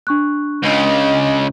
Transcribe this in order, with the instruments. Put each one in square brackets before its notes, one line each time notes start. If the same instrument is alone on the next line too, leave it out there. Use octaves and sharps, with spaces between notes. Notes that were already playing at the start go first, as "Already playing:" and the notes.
[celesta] D4 C#6 F#6
[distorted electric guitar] C#2 C#3 [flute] D#5